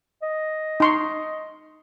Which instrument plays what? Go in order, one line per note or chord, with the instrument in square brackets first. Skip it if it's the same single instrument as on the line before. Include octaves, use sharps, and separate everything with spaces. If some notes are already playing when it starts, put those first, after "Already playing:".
[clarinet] D#5
[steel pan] D#4 C6 C#6